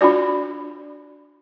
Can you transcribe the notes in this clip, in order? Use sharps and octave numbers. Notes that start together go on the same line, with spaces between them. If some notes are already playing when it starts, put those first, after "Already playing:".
D4 F4 F#4 D5